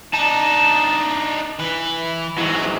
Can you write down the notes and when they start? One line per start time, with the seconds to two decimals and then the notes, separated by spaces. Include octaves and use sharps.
0.13 D4 D#4 A5
1.59 E3 B4
2.37 G#2 E3 F#3